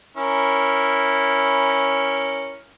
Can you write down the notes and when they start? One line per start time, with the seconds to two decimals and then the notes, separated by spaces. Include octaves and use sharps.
0.17 C#4 E4 A#4